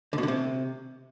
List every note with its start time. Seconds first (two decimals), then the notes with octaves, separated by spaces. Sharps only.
0.13 D3
0.18 B2
0.23 D3
0.28 C3